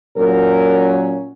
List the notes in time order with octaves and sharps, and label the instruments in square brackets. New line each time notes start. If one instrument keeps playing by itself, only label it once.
[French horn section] A#2 F#3 C#4 A#4